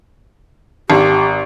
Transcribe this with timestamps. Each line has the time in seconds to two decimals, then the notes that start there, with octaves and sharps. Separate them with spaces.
0.90 G#1 G4